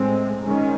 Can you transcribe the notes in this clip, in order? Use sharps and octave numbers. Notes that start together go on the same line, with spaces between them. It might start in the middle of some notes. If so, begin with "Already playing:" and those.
Already playing: A2 G#3 C4
G#2 D#3 G#3 C#4